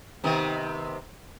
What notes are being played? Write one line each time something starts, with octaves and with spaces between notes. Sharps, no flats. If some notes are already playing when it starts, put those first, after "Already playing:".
C3 D#3 B3